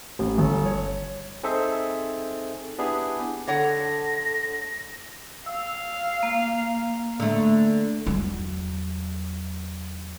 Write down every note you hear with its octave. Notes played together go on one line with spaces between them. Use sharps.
A1
G1
C#5
C4 D#4 G#4 A4 C5 E5
B3 D4 E4 G4 G#4
D3 A4 C#5 F#5 A#6
F5 E6
A#3
D3 A3
E2 F#3